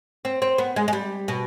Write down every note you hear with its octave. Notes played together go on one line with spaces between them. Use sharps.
C4
C4
B3
G#3
G#3
G3
B2